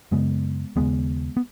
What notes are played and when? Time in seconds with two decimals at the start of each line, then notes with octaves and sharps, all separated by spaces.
0.12 F#2 C#3 G#3 B3
0.76 D#2 C#3 G#3 B3
1.37 B3